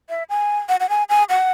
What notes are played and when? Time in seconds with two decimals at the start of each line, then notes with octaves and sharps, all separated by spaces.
0.09 E5
0.30 G#5
0.69 F#5
0.80 F#5
0.89 G#5
1.09 G#5
1.29 F#5